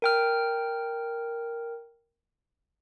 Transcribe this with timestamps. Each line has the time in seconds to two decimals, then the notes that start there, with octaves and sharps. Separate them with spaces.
0.02 A#4 G5 F6